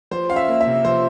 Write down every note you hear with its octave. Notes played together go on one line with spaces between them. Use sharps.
F3 C5
C#4 F5
E5
A#3
E5
C3
F3 C5